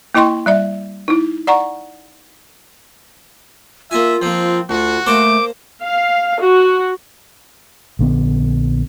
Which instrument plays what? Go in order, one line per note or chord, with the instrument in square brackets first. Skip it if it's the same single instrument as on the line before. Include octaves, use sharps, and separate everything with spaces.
[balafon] A#3 E4 D#5 G5 C6 C#6
G3 D5 E5
D#4 E4
D5 F#5 A#5 C#6
[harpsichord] A#3 G#5 [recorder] F4 [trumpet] E5
[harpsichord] F3 A#3 [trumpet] C4
[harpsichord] D2 [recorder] F4 [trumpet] F#4
[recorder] A3 [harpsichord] A#3 C5 A5 [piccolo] D6
[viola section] F5
F#4
[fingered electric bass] A#1 D3 B3